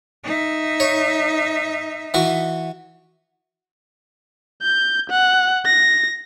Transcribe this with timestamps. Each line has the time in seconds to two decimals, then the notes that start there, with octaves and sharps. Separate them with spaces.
0.24 D#4 E5
0.80 C#5
2.14 E3 F#4
4.62 G6
5.10 F#5
5.65 A#6